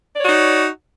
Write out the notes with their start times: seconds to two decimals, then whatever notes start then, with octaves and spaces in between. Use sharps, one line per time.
0.15 D5
0.19 C#5
0.23 F#4
0.27 D#4